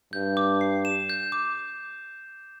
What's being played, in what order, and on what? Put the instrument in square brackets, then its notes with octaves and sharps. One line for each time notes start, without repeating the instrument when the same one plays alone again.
[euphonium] G2 [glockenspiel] G6
[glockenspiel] D6
C7
E7
G6
D6